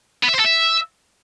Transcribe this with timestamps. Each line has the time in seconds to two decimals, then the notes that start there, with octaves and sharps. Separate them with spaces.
0.24 B3
0.29 E5
0.34 C5
0.40 A4
0.45 E5